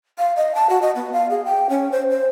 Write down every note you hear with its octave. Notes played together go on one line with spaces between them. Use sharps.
F5
D#5
A5
F#4
D#5
B3
F5
G#4
G5
C#4
C5
C5